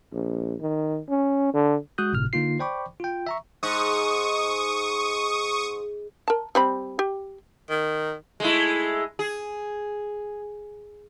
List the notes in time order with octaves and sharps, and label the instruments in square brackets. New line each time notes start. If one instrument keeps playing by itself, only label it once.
[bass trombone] A#1
D#3
C#4
D3
[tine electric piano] G#3 F#4 D#6 F#6 G6
G1 A2 C3 F6
D3 A#3 D#4 F4 C7
C5 D5 G5 B5 C#6 D6
F4 G5
E5 A#5 C#6
[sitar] G#2 [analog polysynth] C#6 D#6
[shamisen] A#4 A5
G3 C4 B5
G4
[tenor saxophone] D#3
[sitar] G#3 A3 E4
G#4